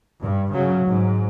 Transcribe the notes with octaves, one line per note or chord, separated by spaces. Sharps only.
G2
C#3 F#3
G#2